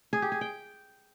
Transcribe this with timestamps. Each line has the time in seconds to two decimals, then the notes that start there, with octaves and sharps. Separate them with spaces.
0.13 G#4
0.22 G4
0.32 G#4
0.41 G5